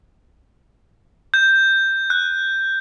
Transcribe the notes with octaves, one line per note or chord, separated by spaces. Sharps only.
G6
F#6